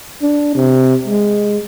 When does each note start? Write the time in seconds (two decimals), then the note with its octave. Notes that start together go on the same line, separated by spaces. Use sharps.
0.23 D4
0.55 C3
1.07 G#3